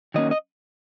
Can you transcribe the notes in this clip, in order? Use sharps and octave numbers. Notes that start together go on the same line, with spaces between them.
D#3 F#3 A#3 C#4 D#5
D#5